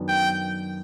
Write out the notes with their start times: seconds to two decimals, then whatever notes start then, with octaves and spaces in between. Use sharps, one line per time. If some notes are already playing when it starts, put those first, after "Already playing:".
Already playing: F#2 D#3 F#3 B3 D4
0.09 G5